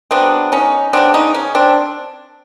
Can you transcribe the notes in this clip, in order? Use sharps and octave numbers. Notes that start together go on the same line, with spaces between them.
C#3 F#3 B3 C4 D4
C#4 D#4
C#3 F#3 B3 C4 D4
C#4 D#4
C#4
C4 D4